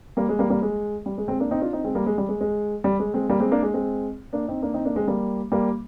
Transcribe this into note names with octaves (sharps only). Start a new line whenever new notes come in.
G3 A#3
G#3
G3 A#3
G3 A#3
G#3
G3
G#3
G#3 C4
A#3 D4
C4 D#4
D4 F4
C4 D#4
G#3 C4
G3 A#3
G#3
G3
G#3
G#3
G3
G#3
G#3 C4
G3 A#3
G#3 C4
A#3 D4
G#3
G#3 C4
A#3 D4
C4 D#4
A#3 D4
C4 D#4
A#3 D4
G#3 C4
G3 A#3
G3 A#3